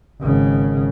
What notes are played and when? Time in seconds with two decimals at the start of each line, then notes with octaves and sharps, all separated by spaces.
0.21 G#1 C#3